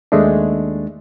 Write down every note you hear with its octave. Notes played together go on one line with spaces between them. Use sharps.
D#2 G#3 A3 D4